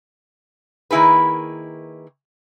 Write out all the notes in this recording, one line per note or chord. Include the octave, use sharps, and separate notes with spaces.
D#3 A#3 E4 G#4 B4